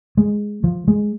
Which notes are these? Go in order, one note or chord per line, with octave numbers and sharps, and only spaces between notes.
G#3
F3
G#3